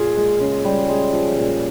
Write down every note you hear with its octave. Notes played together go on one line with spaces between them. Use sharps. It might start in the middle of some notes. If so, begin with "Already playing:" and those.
Already playing: A#2 F4 G#4
G#3
C#3
G3
G#3
F3
A#2